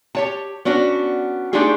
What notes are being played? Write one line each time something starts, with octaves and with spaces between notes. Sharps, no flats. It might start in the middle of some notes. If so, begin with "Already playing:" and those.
G4 C#5 A5
B3 C#4 D4 F#4
A3 D4 D#4 F4 G4 G#4